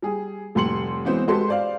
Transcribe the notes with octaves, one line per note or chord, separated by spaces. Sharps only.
G3 G#4
F1 A2 G3 C6 C#7 F#7
E3 F#3 G#3 B3 C4 C5
G#3 F#4 G4 A4 B4 C6
C5 D5 F5